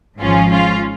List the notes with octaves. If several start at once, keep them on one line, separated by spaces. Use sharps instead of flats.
G#1 G#2 F3 C#4 F4
C#4 F4